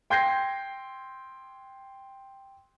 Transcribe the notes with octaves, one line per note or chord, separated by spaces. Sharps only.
G5 C6 G6 G#6 A#6 C7